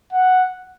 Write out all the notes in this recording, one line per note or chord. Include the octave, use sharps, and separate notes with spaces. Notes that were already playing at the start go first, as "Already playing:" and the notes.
F#5